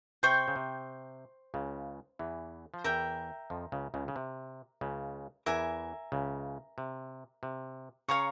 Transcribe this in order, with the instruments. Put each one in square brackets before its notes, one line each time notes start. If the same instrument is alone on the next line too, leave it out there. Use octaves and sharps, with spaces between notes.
[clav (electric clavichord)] C3 [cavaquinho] C5 G5 C#6
[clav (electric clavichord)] C#3
C3
C#2 C#3
E2 E3
F3
[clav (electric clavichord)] E2 E3 [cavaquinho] A#4 E5 G5
[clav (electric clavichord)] F2 F3
C#2 C#3
C#2 C#3
C#3
C3
C#2 C#3
[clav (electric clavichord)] E2 E3 [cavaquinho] A#4 E5 G#5
[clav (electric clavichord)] C#2 C#3
C3
C3
[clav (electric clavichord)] C#3 [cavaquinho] C#5 F5 A#5 C#6